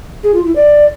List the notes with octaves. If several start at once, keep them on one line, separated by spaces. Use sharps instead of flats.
G#4
F4
E4
D5